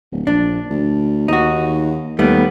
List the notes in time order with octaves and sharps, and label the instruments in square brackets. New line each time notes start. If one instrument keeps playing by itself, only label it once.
[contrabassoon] D1
[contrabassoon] A#1 [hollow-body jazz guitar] D4
[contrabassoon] D2
[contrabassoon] D#2 [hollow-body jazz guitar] D#4 F#4
[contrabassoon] D#2 [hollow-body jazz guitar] G3 A3 B3